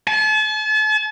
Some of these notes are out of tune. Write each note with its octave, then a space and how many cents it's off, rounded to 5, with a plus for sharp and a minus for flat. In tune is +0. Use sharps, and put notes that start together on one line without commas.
A5 -40